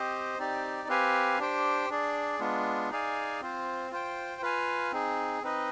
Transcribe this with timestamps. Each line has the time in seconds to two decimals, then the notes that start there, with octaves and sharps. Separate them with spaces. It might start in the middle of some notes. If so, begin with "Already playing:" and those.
Already playing: C4 G4 C5 D#5
0.38 C4 D#4 G4 D5
0.88 C4 G4 B4 F5 G#5
1.39 D4 G4 C5 G5
1.90 D4 G#4 D5
2.40 G#3 B3 D4 F4
2.90 D#4 G#4 D5 F5 G#5
3.41 C4 F4 C5
3.91 F4 C5 G5
4.42 F4 B4 F5 G#5
4.92 C4 D#4 G#4
5.42 C4 D#4 B4 D#5